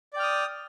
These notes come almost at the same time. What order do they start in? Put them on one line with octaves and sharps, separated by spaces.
D5 G5 F6 D#6